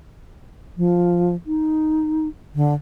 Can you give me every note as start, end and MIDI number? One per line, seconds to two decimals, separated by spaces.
0.77 1.35 53
1.47 2.28 63
2.55 2.74 50